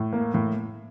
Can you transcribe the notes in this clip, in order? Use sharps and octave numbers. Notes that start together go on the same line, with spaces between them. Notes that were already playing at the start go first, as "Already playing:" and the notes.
Already playing: A2
A#3
A2